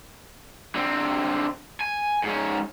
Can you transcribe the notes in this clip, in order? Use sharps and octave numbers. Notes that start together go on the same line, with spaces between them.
D3 C4
G#5
G#2 C#4